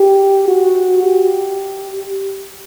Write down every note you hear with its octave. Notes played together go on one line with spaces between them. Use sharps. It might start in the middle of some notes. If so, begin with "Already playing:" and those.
Already playing: G4
F#4
G4